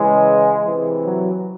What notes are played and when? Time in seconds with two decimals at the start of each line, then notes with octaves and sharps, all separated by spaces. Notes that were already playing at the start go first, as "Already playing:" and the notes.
Already playing: C#3 E3 G#3
0.64 C3 E3
1.04 F#3